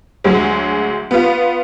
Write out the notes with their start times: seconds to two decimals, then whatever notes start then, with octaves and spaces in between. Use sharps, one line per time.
0.24 D2 F#3 G#3
1.11 B3 F4